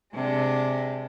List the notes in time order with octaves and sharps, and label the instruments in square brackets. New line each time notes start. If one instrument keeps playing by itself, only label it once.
[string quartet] C3 G#3 D4